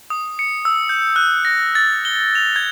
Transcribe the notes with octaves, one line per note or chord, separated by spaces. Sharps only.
D#6
C#7
E6
G6
F#6
A#6
A6
G7
F7
G#6